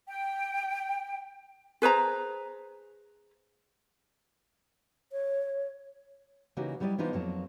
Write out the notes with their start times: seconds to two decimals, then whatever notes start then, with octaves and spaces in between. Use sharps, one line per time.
0.08 G5
1.82 G#4 B4 C5 A#5
5.12 C#5
6.57 C#3 E3 A#3 D#4 F#4 G4
6.80 F#3 G3 E4 A#4 D5 D#5
6.98 E3 B3 D4 D#4 F4 C5
7.13 F2 F#3 A#3 A5